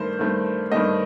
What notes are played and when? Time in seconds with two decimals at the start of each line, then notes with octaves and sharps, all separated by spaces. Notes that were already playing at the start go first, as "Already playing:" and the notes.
Already playing: G2 D#3 A3 C5
0.19 G2 D#3 A3
0.71 G2 D#3 A3 D#5